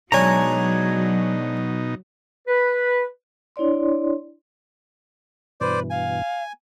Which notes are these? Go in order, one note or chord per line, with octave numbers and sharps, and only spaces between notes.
B2 F#3 G#3 D4 D#4 C#5 G#5 A#5
B4
D4 E4 C#5 D5 C6
G2 B2 E3 B4 C5 D5
F5 G#5